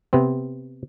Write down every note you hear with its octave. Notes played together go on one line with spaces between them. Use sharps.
C3 B3 C4